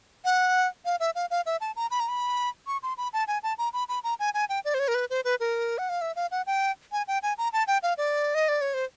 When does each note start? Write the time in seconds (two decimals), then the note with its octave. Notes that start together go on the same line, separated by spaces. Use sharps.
0.25 F#5
0.85 F5
1.00 E5
1.15 F5
1.31 F5
1.46 E5
1.61 A5
1.76 A#5
1.91 B5
2.00 A#5
2.08 B5
2.67 C#6
2.83 C6
2.98 B5
3.13 A5
3.28 G#5
3.43 A5
3.58 A#5
3.73 B5
3.89 B5
4.04 A#5
4.19 G#5
4.34 G#5
4.49 G5
4.65 D5
4.74 C5
4.79 C#5
4.88 A#4
4.95 B4
5.10 C5
5.25 B4
5.40 A#4
5.78 F#5
5.89 F5
6.01 E5
6.16 F5
6.31 F#5
6.47 G5
6.92 G#5
7.08 G5
7.23 G#5
7.38 A#5
7.53 A5
7.67 G5
7.83 F5
7.98 D5
8.35 D#5
8.49 D5
8.61 C#5
8.74 C5